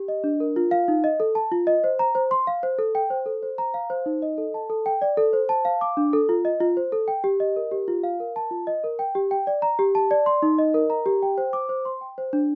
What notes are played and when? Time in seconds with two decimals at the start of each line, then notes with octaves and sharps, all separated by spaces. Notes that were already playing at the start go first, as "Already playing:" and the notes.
Already playing: G4
0.08 D#5
0.24 D4
0.40 A#4
0.56 F4
0.71 F5
0.88 D#4
1.04 D#5
1.20 A4
1.35 A5
1.52 F4
1.67 D#5
1.84 C5
1.99 A#5
2.15 C5
2.31 C6
2.47 F5
2.63 C5
2.79 A4
2.95 G5
3.10 C5
3.26 A4
3.43 C5
3.58 A#5
3.74 F5
3.90 C5
4.06 D#4
4.22 D#5
4.38 A4
4.54 A5
4.70 A4
4.86 G5
5.02 D5
5.17 A4
5.33 C5
5.49 A5
5.65 F5
5.81 D6
5.97 D4
6.13 A4
6.29 F4
6.45 D#5
6.60 F4
6.77 C5
6.92 A4
7.08 G5
7.24 G4
7.40 D#5
7.56 A#4
7.71 G4
7.88 F4
8.03 F5
8.20 A#4
8.36 A5
8.51 F4
8.67 D#5
8.84 A#4
8.99 G5
9.15 G4
9.31 G5
9.47 D5
9.62 A#5
9.79 G4
9.95 A5
10.11 D5
10.26 C6
10.42 D#4
10.58 D#5
10.74 A#4
10.90 A#5
11.06 G4
11.23 G5
11.38 C5
11.53 D6
11.69 C5
11.85 C6
12.01 G5
12.18 C5
12.33 D4